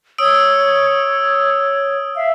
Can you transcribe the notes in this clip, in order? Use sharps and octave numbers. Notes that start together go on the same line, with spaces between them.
C#5 D#6 E6 D7
E5 F5